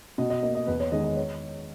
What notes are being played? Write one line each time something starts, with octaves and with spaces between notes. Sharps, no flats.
B2 D#5
D#5
A#3 D#5
D#5
E2 B4
C#5
D#3 G#3 D#5
D#5
C#5